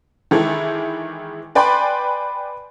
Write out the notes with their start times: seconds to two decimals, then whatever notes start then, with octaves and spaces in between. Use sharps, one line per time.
0.31 D#3 E3 G#3 E4 A4
1.55 B4 D5 G5 G#5 B5 C6